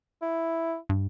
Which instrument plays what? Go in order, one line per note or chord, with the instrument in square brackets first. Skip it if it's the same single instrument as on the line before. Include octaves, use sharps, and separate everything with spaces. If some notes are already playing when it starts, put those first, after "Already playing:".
[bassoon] E4
[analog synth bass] G2